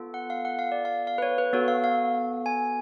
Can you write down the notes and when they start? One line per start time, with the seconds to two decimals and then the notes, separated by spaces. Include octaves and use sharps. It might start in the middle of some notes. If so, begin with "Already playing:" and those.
Already playing: B3 F4 A4
0.14 F#5
0.30 F5
0.45 F#5
0.59 F5
0.72 D5
0.85 F5
1.07 F5
1.18 B4
1.22 C#5
1.38 B4
1.53 B3 F#4 A4 C#5
1.68 F5
1.84 F5
2.46 G#5